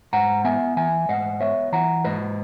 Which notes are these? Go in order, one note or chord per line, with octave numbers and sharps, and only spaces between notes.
G#2 F#5 A#5
B3 E5 G#5
E3 E5 G#5
G#2 D#5 F#5
B3 C#5 E5
E3 F#5 A#5
G#2 B4 D#5